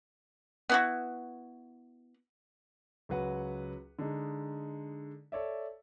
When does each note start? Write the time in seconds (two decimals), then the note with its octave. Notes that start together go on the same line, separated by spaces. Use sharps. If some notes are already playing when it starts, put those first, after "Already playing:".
0.70 B3 E4 F#4
3.09 C#2 F#3 B4 F#5
3.99 D3 G#3 D#4
5.32 A4 C#5 D5 E5